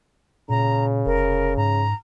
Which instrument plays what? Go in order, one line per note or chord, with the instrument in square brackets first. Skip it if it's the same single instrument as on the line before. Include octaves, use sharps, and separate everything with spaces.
[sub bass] A#2 [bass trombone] C#3 [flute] A#5
[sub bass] F1 [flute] A#4
[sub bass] G#2 [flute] A#5